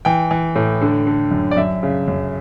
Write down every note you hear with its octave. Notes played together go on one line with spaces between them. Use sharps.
E3 G5
E3
A2
D3
D3
F#2
D5
F#2 E5
C#3
F#2